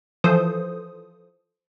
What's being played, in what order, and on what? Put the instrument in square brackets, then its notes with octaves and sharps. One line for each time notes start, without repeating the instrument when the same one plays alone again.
[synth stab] E3 F3 A4 C5 D#6